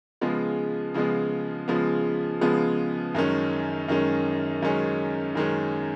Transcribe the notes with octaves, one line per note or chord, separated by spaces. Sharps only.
C#3 F3 G#3 B3
C#3 F3 G#3 B3
C#3 F3 G#3 B3
C#3 F3 G#3 B3
F#2 D#3 G#3 C#4
F#2 D#3 G#3 C#4
F#2 D#3 G#3 C#4
F#2 D#3 G#3 C#4